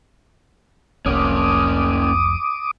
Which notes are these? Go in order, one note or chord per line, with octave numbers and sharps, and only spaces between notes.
F1 C2 F2 A#3 C#4 D6 D#6